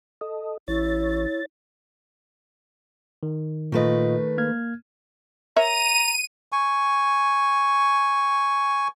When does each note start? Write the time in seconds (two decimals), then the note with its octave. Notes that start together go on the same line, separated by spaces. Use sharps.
0.21 A4 D#5
0.68 A1 E4 C#5 A6
3.23 D#3
3.72 A#2 D#3 A3 F4 B4 D#5
4.38 A#3 F6 G#6
5.56 A#4 C#5 E5 A#5 D#7
6.52 G#5 C#6